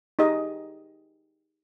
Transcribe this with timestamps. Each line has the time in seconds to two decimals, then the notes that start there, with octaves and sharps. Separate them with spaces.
0.19 D#4 G4 G#4 D#5